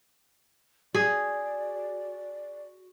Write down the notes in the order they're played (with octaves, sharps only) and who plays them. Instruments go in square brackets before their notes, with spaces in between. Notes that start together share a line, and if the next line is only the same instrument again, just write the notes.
[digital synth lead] F#4 [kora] G#4 [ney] D5